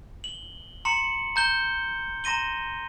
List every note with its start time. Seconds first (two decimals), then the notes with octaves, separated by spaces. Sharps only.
0.24 F#7 G7
0.85 A#5 C6 C#7 F#7
1.36 A#5 G6 G7
2.24 A#5 C6 A#6 D#7 G7